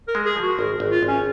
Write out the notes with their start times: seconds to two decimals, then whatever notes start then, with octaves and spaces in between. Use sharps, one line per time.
0.08 A#4
0.15 G#3
0.25 G#4
0.36 F3
0.42 F#4
0.59 G#1 A#4
0.80 G#1
0.91 F4
1.03 G#1
1.08 C#4